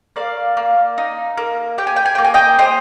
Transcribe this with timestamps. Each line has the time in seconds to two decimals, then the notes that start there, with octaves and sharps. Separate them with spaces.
0.16 A#3 D5 F5
0.57 A#3
0.98 D#4
1.37 A#3
1.78 G4 G5
1.87 G#5
1.96 G5
2.06 G#5
2.15 A#3 G5
2.25 G#5
2.34 D#5 G5
2.59 G4 C5 D#5